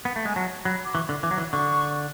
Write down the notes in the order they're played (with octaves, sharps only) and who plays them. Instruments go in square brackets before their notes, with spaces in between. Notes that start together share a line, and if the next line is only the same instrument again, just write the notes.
[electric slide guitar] B3
A3
[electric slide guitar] G#3 [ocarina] G#5
[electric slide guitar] F#3 [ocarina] A5
[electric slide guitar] F#3 [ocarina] B5
[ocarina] D6
[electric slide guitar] E3 [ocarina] C#6
[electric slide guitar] D3
[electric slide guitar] E3 [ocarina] D6
[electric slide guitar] F#3
E3
[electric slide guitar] D3 [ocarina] C#6